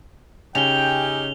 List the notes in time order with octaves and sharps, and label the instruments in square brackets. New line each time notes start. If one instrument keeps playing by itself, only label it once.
[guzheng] C#3 [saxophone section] C#4 D#4 G4 [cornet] G5 [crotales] F7 G7